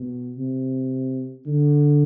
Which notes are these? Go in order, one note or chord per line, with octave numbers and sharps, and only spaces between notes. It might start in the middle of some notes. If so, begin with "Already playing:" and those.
Already playing: B2
C3
D3